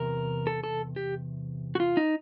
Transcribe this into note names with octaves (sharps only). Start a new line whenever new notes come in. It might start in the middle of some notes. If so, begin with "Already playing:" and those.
Already playing: E2 C3 A#4
A4
A4
G4
F#4
F4
D#4